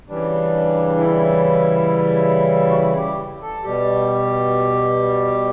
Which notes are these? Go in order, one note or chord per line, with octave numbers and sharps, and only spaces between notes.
C#3 E3 G3 D4
E4
F#4
E4
G4
A4
B2 G3 G4